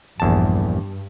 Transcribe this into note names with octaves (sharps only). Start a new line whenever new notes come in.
A#1 E2 G2 A5